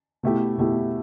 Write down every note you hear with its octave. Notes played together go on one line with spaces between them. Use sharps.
B2 A3 E4 G4
B2 A3 E4 G4